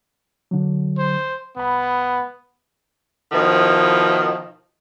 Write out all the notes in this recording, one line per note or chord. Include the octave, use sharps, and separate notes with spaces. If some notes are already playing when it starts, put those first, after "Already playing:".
D3 F#3
C5
C2 B3 B5
B2 D#3 F3 E4